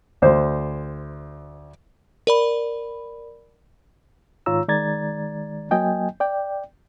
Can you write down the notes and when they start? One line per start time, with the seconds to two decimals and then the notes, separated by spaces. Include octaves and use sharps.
0.22 D2 C5
2.27 A#4 D5 B5
4.46 G#2 D#3 F4 C#5 A#5 E6
4.68 D#3 G#3 D5 A#5 G#6 A6
5.71 F#3 A#3 D#5 G5 G#5
6.20 D5 G5